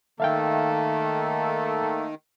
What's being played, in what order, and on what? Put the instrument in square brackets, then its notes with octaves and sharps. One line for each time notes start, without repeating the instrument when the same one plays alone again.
[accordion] D#3 [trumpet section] A3 A#3 A4 [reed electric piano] E5 F5 G5